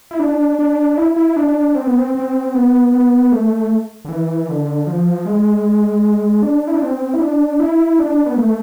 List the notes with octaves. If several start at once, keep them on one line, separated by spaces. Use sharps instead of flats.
E4
D4
D4
E4
E4
D4
C4
B3
C4
C4
B3
B3
A3
D3
E3
D3
F3
G#3
D4
E4
D4
C4
E4
D4
E4
D4
B3
A3